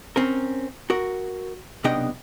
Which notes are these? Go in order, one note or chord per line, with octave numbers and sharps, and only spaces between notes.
C4 C#4 A#4
F#4 A#4
B1 C3 B3 D4 D#5 G5